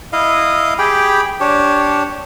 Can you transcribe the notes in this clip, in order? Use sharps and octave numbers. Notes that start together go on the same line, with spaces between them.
E4 D#5 F5
G4 G#4 G5 B5
D4 G4 C#5